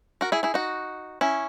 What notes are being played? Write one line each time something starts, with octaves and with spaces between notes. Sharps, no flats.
F#4 A#4
E4 G#4
E4 G#4
D#4 F#4
C#4 E4